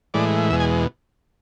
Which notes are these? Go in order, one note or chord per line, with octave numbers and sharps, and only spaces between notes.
A2 E3 G#3 D5
E2 B2 G#3 E5
G#5